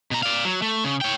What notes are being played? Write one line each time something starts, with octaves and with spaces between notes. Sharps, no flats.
B2 A#5
D5 F5
F#3
A3
C#3
C#5 G5